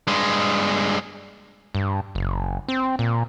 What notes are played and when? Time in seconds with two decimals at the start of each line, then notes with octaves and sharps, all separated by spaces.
0.07 G2 G#3
1.75 G2
2.15 F#1
2.68 C4
2.99 A#2